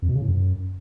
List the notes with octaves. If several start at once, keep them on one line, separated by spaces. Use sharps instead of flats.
F2
B2
C#3
A2
F#2